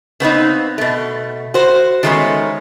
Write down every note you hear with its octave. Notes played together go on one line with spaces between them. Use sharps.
C#3 B3 C4 D#4
B2 A3
F#4 C5
D#3 F#3 G#3 A3 B3 C#4